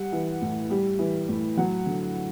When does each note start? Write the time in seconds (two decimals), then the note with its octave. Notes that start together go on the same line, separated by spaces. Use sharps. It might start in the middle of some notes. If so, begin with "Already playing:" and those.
Already playing: G3 F#5
0.12 E3
0.42 A2
0.70 G3
0.99 E3
1.29 A2
1.57 F#3 F#5
1.86 D3